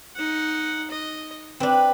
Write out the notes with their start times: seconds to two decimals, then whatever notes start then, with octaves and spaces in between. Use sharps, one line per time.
0.16 D#4 F#5
0.91 D#5
1.60 C4 D4 B4